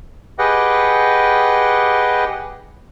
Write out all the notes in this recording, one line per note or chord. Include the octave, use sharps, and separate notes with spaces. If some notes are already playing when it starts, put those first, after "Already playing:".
G4 G#4 B4 D#5 F#5 G5